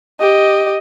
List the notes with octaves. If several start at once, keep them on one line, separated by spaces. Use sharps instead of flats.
G4 D#5